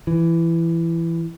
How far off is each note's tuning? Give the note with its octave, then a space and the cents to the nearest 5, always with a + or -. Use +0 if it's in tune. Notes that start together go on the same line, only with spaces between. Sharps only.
E3 +15